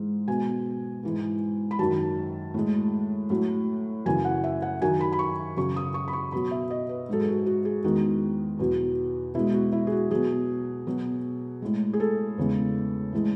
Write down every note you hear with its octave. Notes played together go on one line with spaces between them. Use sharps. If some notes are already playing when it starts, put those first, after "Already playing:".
Already playing: G#2 E3 G#3
B2 G#3 G#5
G#2 E3 G#3
B5
F#2 D#3 F#3 A5
A2 G#3
A2 F#3
F#2 C#3 E3 G#5
F#5
E5
F#5
F#2 D#3 F#3 G#5
B5
B5
C#6
F#2 C#3 F#3 C#6
D#6
C#6
B5
C#6
B2 F#3 B5
E5
D#5
B4
G#2 F#3 A4
G#4
F#4
F#4
G#4
E2 D#3 G#3 F#4
E2 B2 F#3
B2 G#3 E4
F#4
E4
G#4
F#4
B2 F#3 G#4
B2 F#3
A2 G#3
G#4
A4
E2 C#3 G#3
A2 E3 G#3